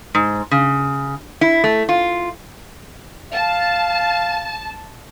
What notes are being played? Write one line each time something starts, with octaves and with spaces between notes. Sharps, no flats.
G#2
C#3
E4
A3
F4
F5 A5